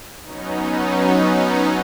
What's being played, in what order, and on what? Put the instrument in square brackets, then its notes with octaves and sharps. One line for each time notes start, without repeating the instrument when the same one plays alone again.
[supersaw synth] F#3 B3 C#4 D#4